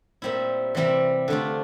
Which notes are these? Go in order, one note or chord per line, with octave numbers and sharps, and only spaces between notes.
A#2 G3 C4 E4
C3 E3 G3 C4 E4
D3 A3 D4 F4